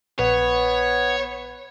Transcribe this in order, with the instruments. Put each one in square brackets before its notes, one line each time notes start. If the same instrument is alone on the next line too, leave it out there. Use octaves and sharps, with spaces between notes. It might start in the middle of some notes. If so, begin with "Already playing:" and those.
[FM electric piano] A#1 [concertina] B3 [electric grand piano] B4 [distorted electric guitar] C#5